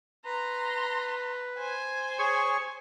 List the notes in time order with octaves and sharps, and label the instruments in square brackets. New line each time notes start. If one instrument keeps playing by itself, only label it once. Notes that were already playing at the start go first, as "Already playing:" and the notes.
[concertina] B4 [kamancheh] A#5 C6
[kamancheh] C5 G#5
[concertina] G#4 C#5 C#6